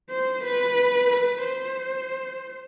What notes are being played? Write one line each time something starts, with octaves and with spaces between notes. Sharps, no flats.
C5
B4
B4
C5